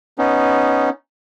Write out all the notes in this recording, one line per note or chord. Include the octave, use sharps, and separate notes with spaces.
B3 C#4 D#4